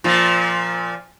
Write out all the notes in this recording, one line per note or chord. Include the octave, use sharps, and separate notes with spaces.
A#2 F3